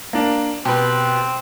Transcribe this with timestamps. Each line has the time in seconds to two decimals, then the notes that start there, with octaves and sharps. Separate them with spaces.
0.13 A#3 D4
0.65 B2 C4 G4 B4